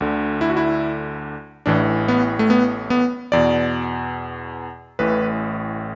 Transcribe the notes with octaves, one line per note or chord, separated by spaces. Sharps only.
D2 D3
E4
F#4
E4
A1 A2 E3 D4
B3
A3
B3
B3
E2 B2 D5
A1 A2 E3 B4